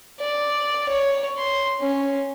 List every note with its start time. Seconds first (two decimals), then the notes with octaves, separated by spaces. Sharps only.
0.20 D5
0.89 C#5
1.37 C6
1.80 C#4